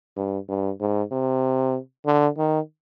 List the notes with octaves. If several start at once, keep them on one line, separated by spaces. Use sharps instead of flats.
G2
G2
G#2
C3
D3
D#3